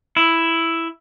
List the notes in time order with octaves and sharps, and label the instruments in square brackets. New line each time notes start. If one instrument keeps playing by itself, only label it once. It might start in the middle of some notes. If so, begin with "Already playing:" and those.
[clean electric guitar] E4